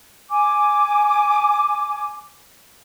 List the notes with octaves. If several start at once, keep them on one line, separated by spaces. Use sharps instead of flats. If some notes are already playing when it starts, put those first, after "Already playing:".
G#5 D6